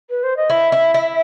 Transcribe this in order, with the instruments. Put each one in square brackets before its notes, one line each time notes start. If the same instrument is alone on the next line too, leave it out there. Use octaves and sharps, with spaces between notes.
[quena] B4
C5
D#5
[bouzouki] E4 [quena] E5
[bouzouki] E4
E4